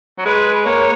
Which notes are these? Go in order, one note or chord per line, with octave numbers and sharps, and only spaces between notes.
F#3
G#3 B4
A#3 C#5